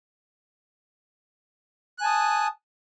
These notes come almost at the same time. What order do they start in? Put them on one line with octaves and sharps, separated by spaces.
F#6 G#5 A5 D#6